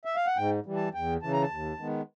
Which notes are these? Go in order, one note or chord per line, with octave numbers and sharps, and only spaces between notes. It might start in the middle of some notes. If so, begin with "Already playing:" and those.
E5
F5
F#5
G#2 G5
E3 G3
A5
E2 G5
C#3 E3 A5
A#5
A5
D#2
D#3 G#3 B3